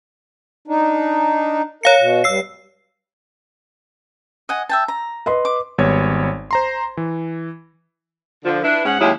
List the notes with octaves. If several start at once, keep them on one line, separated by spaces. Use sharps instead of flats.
D4 D#4
A#4 C#5 F5 C#7
B2
G2 E6 C7
D#5 F#5 G#5
E5 G5 A5
A#5
B4 D#5 C6
D6
G#1 G3 B3 C#5 G#6
C5 A#5 C6
E3
D3 F3
D4 E4 B4
G#2 C#4 G#4 F#5
D#2 F#3 G#3 C#4 E4 G4